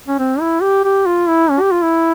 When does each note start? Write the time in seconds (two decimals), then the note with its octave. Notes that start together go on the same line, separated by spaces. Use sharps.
0.08 C#4
0.19 C4
0.40 E4
0.62 G4
0.85 G4
1.06 F4
1.28 E4
1.50 C#4
1.61 G4
1.72 F4
1.82 E4